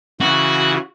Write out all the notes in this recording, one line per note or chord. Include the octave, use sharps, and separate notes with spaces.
C#3 E3 F#4